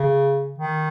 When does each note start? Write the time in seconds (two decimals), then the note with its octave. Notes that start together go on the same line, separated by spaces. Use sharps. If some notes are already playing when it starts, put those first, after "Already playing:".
Already playing: C#3
0.58 D#3